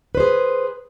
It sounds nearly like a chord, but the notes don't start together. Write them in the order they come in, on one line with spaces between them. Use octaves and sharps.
B4 C5 G#4